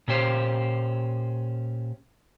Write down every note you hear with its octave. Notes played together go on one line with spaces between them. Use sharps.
A#2 C#4 G4 C5 F5